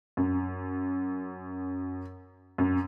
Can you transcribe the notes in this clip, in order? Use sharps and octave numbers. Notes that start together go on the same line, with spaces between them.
F#2
F#2